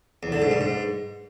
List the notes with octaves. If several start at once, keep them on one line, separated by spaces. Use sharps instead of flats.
E2
D3
G#2
G2
G#2